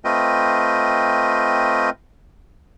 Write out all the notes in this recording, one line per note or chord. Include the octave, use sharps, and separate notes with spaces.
A3 C4 F4 B4 D#5 G5